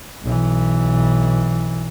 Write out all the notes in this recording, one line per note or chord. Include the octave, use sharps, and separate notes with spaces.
B1 E3